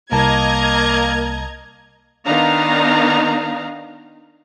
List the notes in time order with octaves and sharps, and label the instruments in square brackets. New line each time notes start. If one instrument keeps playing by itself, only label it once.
[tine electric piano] C2 A5 [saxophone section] A#3 [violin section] D#5 A#5 G#6
[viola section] D#3 B3 D4 D#4 F5 A#5